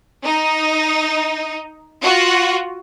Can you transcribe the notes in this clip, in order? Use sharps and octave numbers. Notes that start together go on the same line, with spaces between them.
D#4
F4 F#4